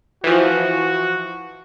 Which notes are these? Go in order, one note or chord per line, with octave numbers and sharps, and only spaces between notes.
E3 F3 F#4